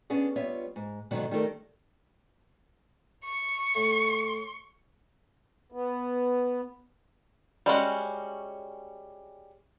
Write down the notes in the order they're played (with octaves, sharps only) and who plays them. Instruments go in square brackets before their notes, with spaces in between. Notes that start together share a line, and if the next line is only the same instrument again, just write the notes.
[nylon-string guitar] B3 C#4 D4 G#4
G3 B3 F4 C#5 E5
G#2
G#2 B2 D3 D#3 F#3 D4
D#3 G3 A3 D4 A4 A#4
[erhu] C#6
[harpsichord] A2 A3
[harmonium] B3
[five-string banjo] G3 G#3 C#4 F#4